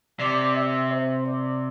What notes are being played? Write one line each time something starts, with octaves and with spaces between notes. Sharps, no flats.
C3 D5
E5
C5
D5